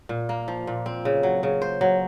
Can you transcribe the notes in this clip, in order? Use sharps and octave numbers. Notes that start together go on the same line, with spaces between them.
A#2
A#3
F3
A#2
C4
C#3
F#3
C#3
C5
F#3